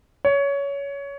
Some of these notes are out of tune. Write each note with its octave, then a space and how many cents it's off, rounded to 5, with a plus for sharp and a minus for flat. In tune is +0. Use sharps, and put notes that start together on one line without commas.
C#5 +20